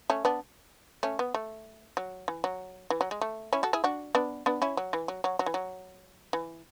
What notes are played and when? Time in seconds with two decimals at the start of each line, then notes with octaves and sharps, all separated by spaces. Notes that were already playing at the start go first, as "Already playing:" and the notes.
0.10 A3 C#4
0.25 B3 D4
1.03 A3 C#4
1.19 B3
1.34 A3
1.97 F#3
2.28 E3
2.44 F#3
2.90 E3
3.01 F#3
3.11 G#3
3.21 A3
3.53 C#4 E4
3.63 F#4 A4
3.73 E4 G#4
3.84 D4 F#4
4.15 B3 D4
4.46 B3 D4
4.62 C#4 E4
4.77 F#3
4.93 E3
5.08 F#3
5.24 F#3
5.39 F#3
5.46 E3
5.54 F#3
6.33 E3